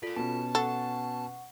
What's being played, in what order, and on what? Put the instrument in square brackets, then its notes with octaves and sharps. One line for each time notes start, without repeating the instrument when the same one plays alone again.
[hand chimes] F4 A4 [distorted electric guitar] A#4 D5
[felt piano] B2 B3 C#4 [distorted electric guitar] A5
[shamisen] A4 [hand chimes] F#5 C#6